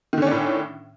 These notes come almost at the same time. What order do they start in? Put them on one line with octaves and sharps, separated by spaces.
D#3 D3 C#4 D4 A2